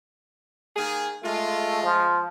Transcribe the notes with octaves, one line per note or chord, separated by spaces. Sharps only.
D#3 A#3 G#4
G#3 A3 F4
F3